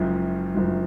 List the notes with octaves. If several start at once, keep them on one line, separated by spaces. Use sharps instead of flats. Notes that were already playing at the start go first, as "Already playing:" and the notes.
Already playing: F#1 F#2 C#3 F3 G#3
F#1 F#2 C#3 F3 G#3